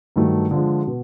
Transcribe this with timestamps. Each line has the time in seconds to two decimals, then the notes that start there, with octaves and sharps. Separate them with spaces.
0.16 G2 D#3 F#3 A3
0.51 D3 F3 G#3
0.87 B2